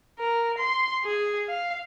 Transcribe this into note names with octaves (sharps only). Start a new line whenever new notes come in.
A#4
C6
G#4
F5